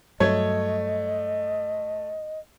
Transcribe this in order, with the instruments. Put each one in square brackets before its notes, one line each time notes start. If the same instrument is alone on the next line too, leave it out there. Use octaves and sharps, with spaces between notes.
[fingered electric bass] G2 F#3 [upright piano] A3 [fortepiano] C#5 [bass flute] D#5